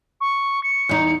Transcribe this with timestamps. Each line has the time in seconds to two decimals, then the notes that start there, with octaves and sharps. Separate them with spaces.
0.21 C#6
0.64 C#7
0.89 E2 D#4